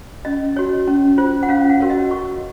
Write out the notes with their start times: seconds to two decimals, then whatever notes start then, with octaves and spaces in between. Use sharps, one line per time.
0.25 C#4 D#5
0.56 F#4 C#5
0.88 C#4
1.18 F4 C5
1.43 F#5
1.49 C#4 F5
1.70 F#5
1.80 F#4 A#4 C#5
1.90 D#5
2.11 F#4 C#6